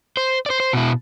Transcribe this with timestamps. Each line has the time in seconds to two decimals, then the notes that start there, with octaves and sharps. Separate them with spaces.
0.17 C5
0.46 C5 D5
0.60 C5
0.73 B2 E4